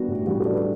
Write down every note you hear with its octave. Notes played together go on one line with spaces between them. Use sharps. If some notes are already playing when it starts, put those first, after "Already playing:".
Already playing: G3 B3 D4 F#4
A2
G3 F#4
A4
D4
B4